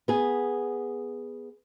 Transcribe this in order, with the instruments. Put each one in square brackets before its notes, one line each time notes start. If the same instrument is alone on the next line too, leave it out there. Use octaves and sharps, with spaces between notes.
[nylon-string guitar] B3 G#4